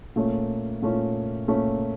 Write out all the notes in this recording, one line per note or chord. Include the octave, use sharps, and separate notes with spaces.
A#2 A3 C#4 F4
A#2 A3 C#4 F4
A#2 A3 C#4 F4